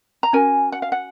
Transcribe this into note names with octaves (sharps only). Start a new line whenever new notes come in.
A#5
C#4 F#4 A#4 G#5
F#5
F5
F#5